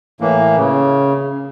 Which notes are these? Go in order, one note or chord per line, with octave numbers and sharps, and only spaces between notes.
A2 E3 A#3
C#3